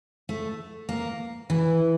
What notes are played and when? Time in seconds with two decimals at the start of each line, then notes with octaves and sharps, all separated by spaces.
0.29 A3
0.89 A#3
1.50 E3